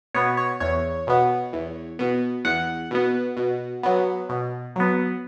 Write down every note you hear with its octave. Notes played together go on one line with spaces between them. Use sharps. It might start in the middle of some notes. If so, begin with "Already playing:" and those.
B2 B3 C#5
C#5
E2 C#5
B2 B3
E2
B2 B3
E2 F#5
B2 B3
B2
F#3 B3
B2
F#3 B3